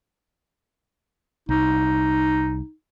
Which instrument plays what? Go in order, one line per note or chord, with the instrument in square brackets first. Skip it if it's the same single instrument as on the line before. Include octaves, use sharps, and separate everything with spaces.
[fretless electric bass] C2 [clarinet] D#4